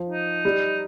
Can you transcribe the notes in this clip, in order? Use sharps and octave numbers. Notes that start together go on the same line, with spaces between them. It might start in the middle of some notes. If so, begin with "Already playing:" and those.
Already playing: F3
D#4
G3